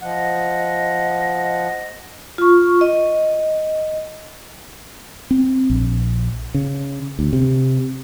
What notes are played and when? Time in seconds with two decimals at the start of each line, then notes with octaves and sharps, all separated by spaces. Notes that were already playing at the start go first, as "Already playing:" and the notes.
0.02 F3 D#5 F#5
2.38 F4 C#6
2.81 D#5
5.31 C4
5.70 A#1
6.54 C#3
7.19 D2
7.33 C3